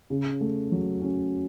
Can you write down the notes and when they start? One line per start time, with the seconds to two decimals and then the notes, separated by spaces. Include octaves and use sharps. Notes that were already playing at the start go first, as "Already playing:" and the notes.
0.10 C#3
0.41 A3
0.72 F#3
1.02 C#4